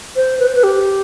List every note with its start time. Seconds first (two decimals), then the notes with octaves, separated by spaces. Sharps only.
0.16 C5
0.39 B4
0.47 C5
0.55 B4
0.64 G4